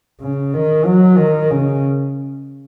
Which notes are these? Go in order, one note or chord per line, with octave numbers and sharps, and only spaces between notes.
C#3
D#3
F#3
D#3
C#3